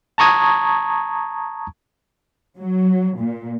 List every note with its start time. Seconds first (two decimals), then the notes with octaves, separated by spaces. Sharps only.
0.18 A5 A#5 C#6 D#6 G#6
2.57 F#3
3.17 A#2